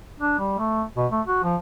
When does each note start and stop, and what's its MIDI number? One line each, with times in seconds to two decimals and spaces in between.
0.20 0.34 62
0.39 0.58 55
0.58 0.83 57
0.97 1.06 47
1.12 1.21 57
1.27 1.40 66
1.43 1.56 53